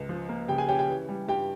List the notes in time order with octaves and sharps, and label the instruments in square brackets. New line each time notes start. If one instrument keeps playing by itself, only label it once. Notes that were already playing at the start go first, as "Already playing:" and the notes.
Already playing: [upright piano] C#2
F3
A#3
C#3 G4 G5
G#4 G#5
C#4 G4 G5
G4 G5
E3
G3
G2 G4 G5